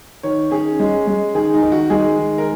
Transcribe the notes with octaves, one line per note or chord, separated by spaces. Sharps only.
D#3 C#5
C#4 G#4
G#3
G#3
D#3 G#4
D#4
D#3
F#4
G#3 G#4
D#3
A#4